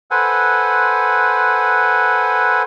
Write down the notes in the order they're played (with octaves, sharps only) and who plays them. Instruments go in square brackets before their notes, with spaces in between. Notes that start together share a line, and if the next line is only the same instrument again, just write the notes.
[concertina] A4 B4 C5 F#5 G#5